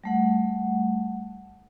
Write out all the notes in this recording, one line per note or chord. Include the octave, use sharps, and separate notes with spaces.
G3 A3 F#5